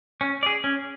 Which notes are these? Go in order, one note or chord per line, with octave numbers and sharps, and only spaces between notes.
C#4
G#4 D5
C#4